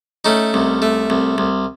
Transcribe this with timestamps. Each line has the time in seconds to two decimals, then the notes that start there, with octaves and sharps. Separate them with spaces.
0.25 A3 C#4 D#4
0.54 C2
0.82 A3
1.10 C2
1.38 C2